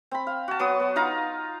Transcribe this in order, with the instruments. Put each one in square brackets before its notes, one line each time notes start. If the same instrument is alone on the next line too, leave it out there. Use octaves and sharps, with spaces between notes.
[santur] C4 B5
F5
F#4 A5
F#3 B3 F#4 D#6
B3
D#4 F4 F5 A#5